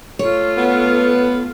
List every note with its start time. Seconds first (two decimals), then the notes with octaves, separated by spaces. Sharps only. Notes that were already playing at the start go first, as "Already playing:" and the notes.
0.19 A3 F4 C#5
0.57 B3